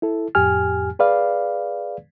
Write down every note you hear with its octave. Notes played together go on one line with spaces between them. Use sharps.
E4 A4
F2 A2 G4 G#5 F6
G#4 B4 D5 F5